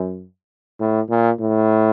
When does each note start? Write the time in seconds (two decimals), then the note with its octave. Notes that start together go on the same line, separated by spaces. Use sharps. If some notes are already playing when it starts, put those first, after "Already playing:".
Already playing: F#2
0.80 A2
1.09 A#2
1.40 A2